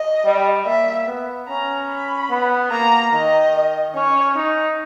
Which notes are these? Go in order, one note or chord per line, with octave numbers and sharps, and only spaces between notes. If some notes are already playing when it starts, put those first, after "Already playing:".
Already playing: D#5
G3
A#3 E5
B3
C#4 A#5
B5
B3
A#3 A#5
D#3 D#5
C#4 C#5
D#4